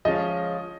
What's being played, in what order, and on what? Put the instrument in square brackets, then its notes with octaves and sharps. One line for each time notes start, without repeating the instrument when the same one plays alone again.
[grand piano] F3 G#3 C#4 F4 [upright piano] D#5